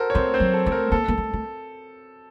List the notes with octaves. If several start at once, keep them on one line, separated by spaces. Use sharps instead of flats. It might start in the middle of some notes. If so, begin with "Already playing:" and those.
Already playing: F#4 A4 A#4 C5
C#5
A3 C4 C5
C4 C5
F#3
A4
A3
A#4
A#3 A4
A#3
A3
A3